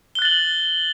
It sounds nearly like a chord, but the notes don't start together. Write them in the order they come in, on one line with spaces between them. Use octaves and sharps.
G7 F#6 A6 F#7